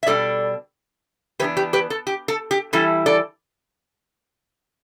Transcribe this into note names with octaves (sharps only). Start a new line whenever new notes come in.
E5
B2 G3 D4 A4 D5
E3 B3 D4 G4 B4
G4 B4
G4 B4
A4
G4
A4
G4
E3 G3 E4 A4
A4 D5